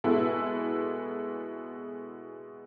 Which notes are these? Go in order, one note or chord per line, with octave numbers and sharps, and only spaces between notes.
B2 G#3 B3 E4 A4